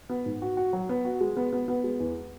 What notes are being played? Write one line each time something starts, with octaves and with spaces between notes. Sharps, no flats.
B3
G#2
F#4
F#4
F#3
B3
F#4
G#3
B3
B3
B3
G#3
E2